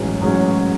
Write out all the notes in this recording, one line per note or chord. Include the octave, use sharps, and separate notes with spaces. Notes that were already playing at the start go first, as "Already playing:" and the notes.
Already playing: A1 G#2 F#3 C#4 G#4
A1 G#2 F#3 C#4 G#4